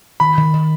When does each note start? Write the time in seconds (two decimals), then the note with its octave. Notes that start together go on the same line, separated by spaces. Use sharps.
0.20 D#3 B5
0.37 D#3
0.54 D#3